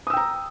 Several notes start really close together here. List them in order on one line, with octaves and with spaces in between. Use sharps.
D#6 E6 G5 A#5